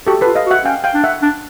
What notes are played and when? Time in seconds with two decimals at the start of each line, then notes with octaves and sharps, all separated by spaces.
0.06 F#4 G4 A4
0.21 F4 A4 B4
0.35 D#5 F5
0.46 F#4
0.51 E5 F#5
0.64 C#4 F5 G5
0.84 F5 G5
0.94 D4
1.04 E5 F#5
1.22 D4